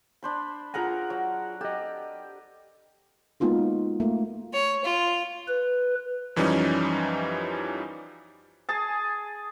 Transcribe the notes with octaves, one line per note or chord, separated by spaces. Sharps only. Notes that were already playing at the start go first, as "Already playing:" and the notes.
D4 C5 B5
F4 G#4 A#4 F#5 G#5 A#5
F#3
G4 A4 D#5
G#3 A#3 B3 D#4 F4 F#4
A3 A#3
C#5
F4
B4
F#2 E3 F3 G3 C#4 D#4
G#4 G#5 A5